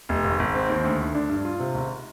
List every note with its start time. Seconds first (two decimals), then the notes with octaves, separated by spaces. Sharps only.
0.09 F1
0.24 G#1
0.39 G#1
0.55 C4
0.69 D#2
0.84 D2
1.00 D2
1.15 D4
1.30 G2
1.45 F4
1.60 C3
1.74 G#1